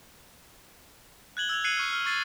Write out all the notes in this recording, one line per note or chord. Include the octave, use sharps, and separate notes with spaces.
F#6 G#6 F#7 G7
E6 G#6 F7
F#6 G#6 C7 C#7 D#7 F#7
C#6 F6
F6
C#6 A6 C7